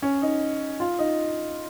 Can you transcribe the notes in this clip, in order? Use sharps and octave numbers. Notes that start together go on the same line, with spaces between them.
C#4
D#4
F4
D#4